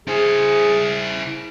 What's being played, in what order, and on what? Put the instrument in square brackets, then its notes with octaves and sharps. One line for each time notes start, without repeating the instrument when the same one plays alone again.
[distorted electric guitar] E4 C5 [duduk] G#4